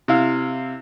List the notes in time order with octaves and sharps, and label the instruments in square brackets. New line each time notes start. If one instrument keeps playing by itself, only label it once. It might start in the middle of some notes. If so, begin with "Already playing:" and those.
[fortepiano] C3 E4 F5